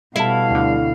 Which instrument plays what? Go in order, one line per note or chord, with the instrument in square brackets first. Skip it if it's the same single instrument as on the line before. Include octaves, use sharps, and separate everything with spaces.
[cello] B2 F5 [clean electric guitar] G3 A4 [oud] E4
[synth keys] D2 D3